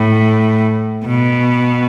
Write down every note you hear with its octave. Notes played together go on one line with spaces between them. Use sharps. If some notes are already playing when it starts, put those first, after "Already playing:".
Already playing: A2
B2